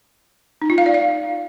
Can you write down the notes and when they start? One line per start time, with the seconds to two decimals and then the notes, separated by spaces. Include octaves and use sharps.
0.62 D#4
0.70 F4
0.78 F5
0.86 D5
0.94 F5